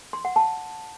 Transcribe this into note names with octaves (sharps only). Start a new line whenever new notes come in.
C6
F#5
A5